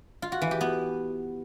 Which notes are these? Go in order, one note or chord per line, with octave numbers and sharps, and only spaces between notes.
F4
F#4
E3
G4
B3